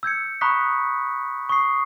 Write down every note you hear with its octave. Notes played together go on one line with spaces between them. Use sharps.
E6 G6 G#6 C#7
A#5 B5 C#6 D#6 F#6 B6
C#6 D#6 C7